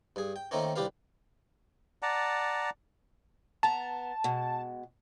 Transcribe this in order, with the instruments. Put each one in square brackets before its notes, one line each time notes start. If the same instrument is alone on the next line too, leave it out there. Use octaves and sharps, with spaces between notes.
[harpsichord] G2 G#4
G5
D#3 A3 A#3 C4 C#4
C2 D4 G4 B4 F5
[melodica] D5 F#5 A5 A#5
[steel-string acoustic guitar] B3 A#5 [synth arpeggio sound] A5
[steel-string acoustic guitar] B2 G#3